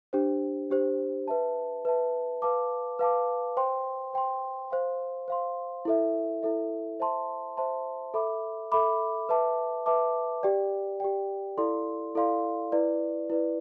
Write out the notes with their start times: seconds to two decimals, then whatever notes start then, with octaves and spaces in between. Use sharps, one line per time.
0.13 D4 G4 C5
0.70 D4 G4 C5
1.28 B4 E5 A5
1.85 B4 E5 A5
2.42 B4 F5 A5 D6
2.99 B4 F5 A5 D6
3.57 C5 G5 C6
4.14 C5 G5 C6
4.71 C5 F5 C6
5.28 C5 F5 C6
5.85 E4 A4 E5
6.43 E4 A4 E5
7.00 C5 E5 A5 C6
7.57 C5 E5 A5 C6
8.14 A4 E5 B5 D6
8.72 A4 E5 B5 D6
9.29 B4 E5 A5 D6
9.86 B4 E5 A5 D6
10.43 G4 D5 G5
11.00 G4 D5 G5
11.58 E4 A4 D5 F5 C6
12.15 E4 A4 D5 F5 C6
12.72 E4 B4 D5
13.30 E4 B4 D5